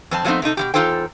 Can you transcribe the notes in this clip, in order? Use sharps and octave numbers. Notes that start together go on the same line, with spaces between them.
F2 C4 A5
F3 F#3 A3 B3 C4 D#4
C3 A3 D#4 A4
B2 E3 G4
E2 D#4 F4 A4 C5 G5